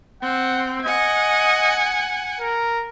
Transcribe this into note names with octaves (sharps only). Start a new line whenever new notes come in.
C4 F#5
D#5 F#5 G#5
A#4